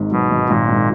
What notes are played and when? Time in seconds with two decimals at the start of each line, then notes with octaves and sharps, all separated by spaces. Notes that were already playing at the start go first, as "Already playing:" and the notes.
Already playing: G#1 G#2
0.11 B2 F#3
0.30 G#1
0.49 G#1 A#2
0.68 G#2